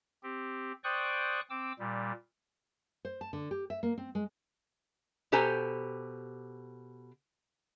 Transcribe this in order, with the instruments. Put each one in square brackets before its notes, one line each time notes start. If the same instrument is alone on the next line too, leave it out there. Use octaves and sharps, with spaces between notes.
[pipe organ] C4 G4
C5 D5 G5 C#6 D#6 F#6
C4 D6 E6
A#2 G3
[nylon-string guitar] C5
A5
D3
G4
E5
A#3
C4
G#3
[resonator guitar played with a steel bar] B2 G4 A4 C5 G#5 A#5